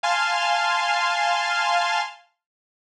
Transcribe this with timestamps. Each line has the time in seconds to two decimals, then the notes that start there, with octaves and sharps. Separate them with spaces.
0.03 F5 G#5 A5 C6 F6